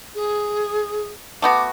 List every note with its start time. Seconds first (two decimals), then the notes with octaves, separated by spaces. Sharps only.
0.15 G#4
1.42 A3 B3 F#4 D6